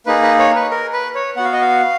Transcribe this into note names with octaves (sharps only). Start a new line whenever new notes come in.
A#3 D#4 G#4 B4
B4
C#5
B4
A#4
B4
C#5
B3 F#4 F#5
F5
D#5
F5